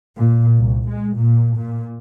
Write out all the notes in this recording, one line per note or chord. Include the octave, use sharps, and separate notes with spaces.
A#2
C2
G#3
A#2
A#2